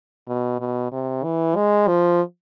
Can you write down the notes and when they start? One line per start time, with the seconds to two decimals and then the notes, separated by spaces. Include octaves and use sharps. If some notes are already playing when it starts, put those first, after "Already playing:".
0.28 B2
0.60 B2
0.92 C3
1.24 E3
1.56 G#3
1.88 F3